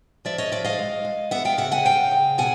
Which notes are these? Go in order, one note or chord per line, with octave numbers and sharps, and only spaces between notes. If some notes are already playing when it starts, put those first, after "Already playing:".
F3 D5 E5
C#5 D#5
F3 D5 E5
D#5 F5
G#3
G#3
B3 E5 F#5
F5 G5
C#3 E5 F#5
F#5 G#5
C#3 F5 G5
C#3
B2 F#5 G#5